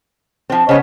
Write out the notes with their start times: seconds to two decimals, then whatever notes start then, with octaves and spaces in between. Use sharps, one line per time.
0.50 F3 C4
0.69 C#3 B3 C5 C#5 D#5